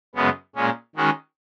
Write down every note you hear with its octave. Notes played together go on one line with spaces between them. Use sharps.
F#2 C#3 G#3 B3
A#2 G#3 C#4
D#3 G#3 C#4 F#4